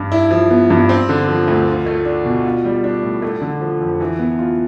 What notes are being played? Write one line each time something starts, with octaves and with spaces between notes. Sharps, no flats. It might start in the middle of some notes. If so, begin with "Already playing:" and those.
Already playing: G2
E4
F3
B3
G2
C4
D3
F3
D2
F4
A3
D4
B2
F4
G3
D4
A2
A3
D3
F3
F2
E3
B3
F4